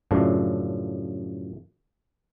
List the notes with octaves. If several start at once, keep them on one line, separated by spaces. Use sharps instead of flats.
F#2 A2 C#3 F3 D4